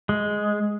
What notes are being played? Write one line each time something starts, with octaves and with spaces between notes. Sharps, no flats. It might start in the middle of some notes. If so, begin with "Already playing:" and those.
G#3